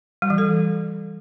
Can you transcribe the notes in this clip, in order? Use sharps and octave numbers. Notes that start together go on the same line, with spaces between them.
G3
E3
A4